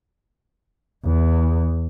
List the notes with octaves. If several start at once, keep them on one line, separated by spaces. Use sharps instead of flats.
E2